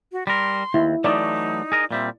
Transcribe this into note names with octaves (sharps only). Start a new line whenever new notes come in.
F#4
G3 A#4 C6
D#2 E4
E3 F#3 A3 D#4 D5
G#4 A#4 D#5
A#2 G3 C4 E5